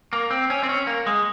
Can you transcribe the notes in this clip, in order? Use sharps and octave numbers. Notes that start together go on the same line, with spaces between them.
A#3
C4
C#4
C4
C#4
A#3
G#3